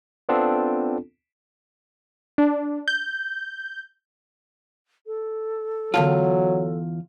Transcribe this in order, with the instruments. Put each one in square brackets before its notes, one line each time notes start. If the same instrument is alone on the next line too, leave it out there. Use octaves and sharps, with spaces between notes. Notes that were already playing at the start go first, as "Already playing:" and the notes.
[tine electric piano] B3 C4 D4 F4 A4
[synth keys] D4
G6
[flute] A4
[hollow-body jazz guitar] E2 G#2 F4 [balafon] D3 F5 A5 [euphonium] F#3